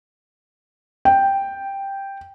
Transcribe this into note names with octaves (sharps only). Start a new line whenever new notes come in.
G5